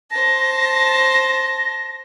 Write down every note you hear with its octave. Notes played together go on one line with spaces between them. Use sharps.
C5 A5 A#6